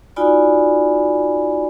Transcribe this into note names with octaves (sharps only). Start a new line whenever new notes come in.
D#4 F4 F#4 D5 G#5 B5